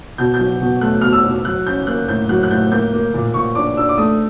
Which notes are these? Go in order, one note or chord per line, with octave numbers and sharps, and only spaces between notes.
B2 G6
G6
F#3
B2
A3 F#6
B2 F6
E6
B2
F#3 F#6
C#4 G6
A#3 F#6
A2 G6
F#3 F#6
F#6
A2 G6
A#3 G6
A#3
A#2
A#2 C#6
D4 D6
D4 E6
D6
A3 D#6